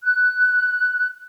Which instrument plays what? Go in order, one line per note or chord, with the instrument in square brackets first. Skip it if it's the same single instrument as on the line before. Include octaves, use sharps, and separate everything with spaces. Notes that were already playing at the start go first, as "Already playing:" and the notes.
[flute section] F#6